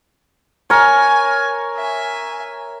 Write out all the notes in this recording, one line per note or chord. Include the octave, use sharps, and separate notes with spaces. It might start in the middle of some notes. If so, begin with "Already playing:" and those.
A#4 C#5 G#5
E5 G#5